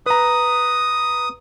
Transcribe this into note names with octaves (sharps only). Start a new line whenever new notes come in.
B4 A#5 D#6